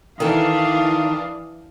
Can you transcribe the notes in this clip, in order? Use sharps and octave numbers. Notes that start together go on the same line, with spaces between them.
D#3 E3 D4 A4 F5 D#6